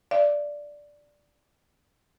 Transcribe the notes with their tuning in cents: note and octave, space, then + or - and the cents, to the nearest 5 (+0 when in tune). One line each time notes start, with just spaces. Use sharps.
D5 +0 F5 -40